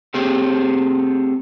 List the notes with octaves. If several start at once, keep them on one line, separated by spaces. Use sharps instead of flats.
A3 C4 G4 G#4